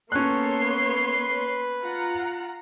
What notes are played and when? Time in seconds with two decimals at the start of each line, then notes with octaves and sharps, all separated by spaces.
0.12 A#3 B3 C#4 A4 C#5 C6 F#6
0.63 B4
1.82 F4 F#5 A#5